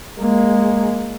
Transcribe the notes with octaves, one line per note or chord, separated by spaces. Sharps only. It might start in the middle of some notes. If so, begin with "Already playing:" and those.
G#3 A#3